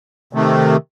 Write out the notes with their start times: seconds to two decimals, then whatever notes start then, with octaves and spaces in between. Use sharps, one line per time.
0.33 C3 D#3 A3